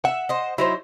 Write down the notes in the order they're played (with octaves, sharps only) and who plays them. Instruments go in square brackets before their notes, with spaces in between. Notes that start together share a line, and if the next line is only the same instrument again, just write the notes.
[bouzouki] E5 [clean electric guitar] F#5
[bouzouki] C5 D#5
[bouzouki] F#3 D#4 C5 [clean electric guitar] E4